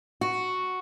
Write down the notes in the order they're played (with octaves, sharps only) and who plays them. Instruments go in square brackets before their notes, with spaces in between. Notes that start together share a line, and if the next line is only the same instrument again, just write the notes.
[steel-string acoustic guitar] F#4